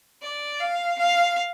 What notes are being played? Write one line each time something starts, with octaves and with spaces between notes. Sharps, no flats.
D5
F5
F5